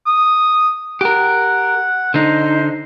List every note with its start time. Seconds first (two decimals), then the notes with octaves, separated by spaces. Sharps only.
0.06 D#6
1.01 G4 A#4 F#5
2.14 D3 D#4 C5